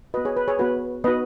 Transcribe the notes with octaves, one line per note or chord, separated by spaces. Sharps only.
B3 F#4 B4 D#5
G#4 C#5
B4
G#4 C#5
B3 F#4 B4
B3 D#4 F#4 B4 D#5